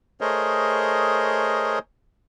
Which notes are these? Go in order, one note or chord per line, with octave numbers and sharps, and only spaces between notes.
A3 G#4 A#4 C5 C#5 D#5